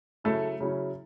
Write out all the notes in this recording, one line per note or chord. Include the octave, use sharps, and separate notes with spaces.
C#3 F#3 A3 C#4 E4 A4
C#3 F#3 C#4 E4